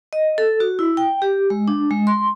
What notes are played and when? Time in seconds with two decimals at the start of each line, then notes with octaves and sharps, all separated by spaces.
0.13 D#5
0.38 A4
0.60 F#4
0.79 E4
0.97 G5
1.22 G4
1.50 G#3
1.68 D4
1.91 G#3
2.07 C6